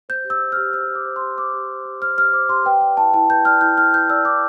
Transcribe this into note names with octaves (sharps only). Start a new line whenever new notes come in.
C5 G6
G4
E6
C5
F6
G4
C5 E6
G4
D6
C5
C6
G4
C5 D6
G4
C5
G4
C5 F6
G4 F6
C5 D6
G4 C6
B4 G5
D5 G5
E4 A5
E4 A5
B4 G6
D5 F6
E4 G6
E4 F6
B4 G6
D5 E6
E4 D6